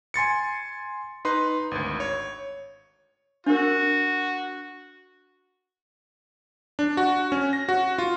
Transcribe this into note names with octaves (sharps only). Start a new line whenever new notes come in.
G#5 C6 A6 C#7
D#4 B4 C6
G#1 D2
C#5
D4 F#4 A#4
D4
F#4
C#4
A#6
F#4
F4